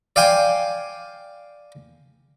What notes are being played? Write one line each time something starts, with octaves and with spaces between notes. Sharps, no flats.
D5 F5 G5 G#5 C6